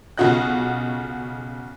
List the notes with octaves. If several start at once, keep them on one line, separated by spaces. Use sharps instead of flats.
B1 C#3 F4 F#4 D#5 F#6